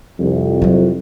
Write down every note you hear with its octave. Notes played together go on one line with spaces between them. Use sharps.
C2 F2
F#3 C4